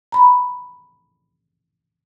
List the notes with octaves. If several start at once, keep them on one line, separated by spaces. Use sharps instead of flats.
A#5 B5